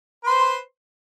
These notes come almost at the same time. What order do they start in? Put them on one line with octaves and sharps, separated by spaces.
B4 C6 C5